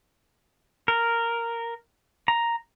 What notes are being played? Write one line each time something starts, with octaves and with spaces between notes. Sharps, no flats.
A#4
A#5